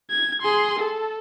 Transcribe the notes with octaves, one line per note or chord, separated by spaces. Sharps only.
G#6
G#4 C6
A4